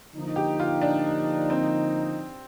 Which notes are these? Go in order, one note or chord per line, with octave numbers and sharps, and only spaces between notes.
D3 F3 A#3 D#4
G4
F4
D4
C4